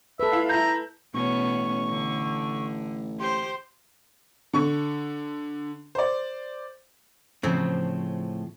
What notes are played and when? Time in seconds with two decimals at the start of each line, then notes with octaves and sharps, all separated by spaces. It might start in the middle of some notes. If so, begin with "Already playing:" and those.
0.20 A4 B4 E5
0.32 E4 F4
0.49 E4 A#5 G6
1.14 A1 B2 B3 C#4 C#6
1.89 D3
3.20 G4 C5 C6
4.53 D3 C#6
5.95 C5 D5
7.43 A2 C#3 F3 C4